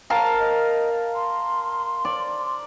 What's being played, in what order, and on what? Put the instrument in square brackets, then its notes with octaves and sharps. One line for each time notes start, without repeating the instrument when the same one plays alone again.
[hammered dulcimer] A#4 F5 A5
[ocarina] D#5
C6
[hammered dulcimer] D5